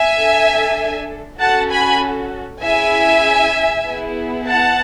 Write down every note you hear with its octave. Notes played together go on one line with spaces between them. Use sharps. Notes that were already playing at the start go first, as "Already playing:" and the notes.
Already playing: E5 G#5
D4 A4
C#4 F#4 A4 F#5 A5
G#5 B5
C#4 E4 G#4 E5 G#5
B3 E4 G#4
F#5 A5